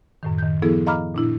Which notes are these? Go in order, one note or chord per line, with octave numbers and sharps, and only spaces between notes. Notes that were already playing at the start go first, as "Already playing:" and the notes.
F#2 A2 D#3
D#3 G6
F3 B3 E4 G#4 A4
D#5 F5 A#5 B5 D6 F6
A#2 D4 E4